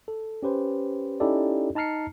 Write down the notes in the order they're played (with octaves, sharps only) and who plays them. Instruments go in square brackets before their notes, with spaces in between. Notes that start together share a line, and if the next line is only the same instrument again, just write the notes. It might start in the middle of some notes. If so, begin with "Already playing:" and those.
[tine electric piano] A4
C#4 G4 B4 C5
C#4 D#4 E4 G4 A4 D5
D#4 A5 A#5 F6 C7 C#7